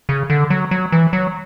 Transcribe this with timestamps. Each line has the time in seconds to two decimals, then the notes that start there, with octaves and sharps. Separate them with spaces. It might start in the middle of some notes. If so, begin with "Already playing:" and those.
0.09 C#3
0.30 D3
0.50 F#3
0.71 F#3
0.92 E3
1.13 F#3